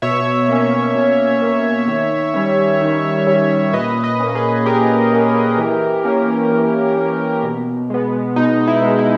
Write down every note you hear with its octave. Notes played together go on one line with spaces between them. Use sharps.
B2 C#5 E5
A#3 C#4
B2
A#3 C#4
D#3
G3 C#4
D#3
G3 C#4
A#2 B4 D#5
B4 D#5
A#3 C#4
G#4 B4
A#2 G4 A#4
A#3 C#4
E3
A#3 C#4
E3
A#3 C#4
B2
G#3 B3
B2 D#4
E4
G#3 B3
E4